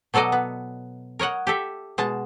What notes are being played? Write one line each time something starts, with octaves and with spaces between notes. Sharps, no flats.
B2 F#3 A4 D5 D#5
B3
A#4 C#5 D#5 F#5
G4 A4 E5
B2 G#3 A5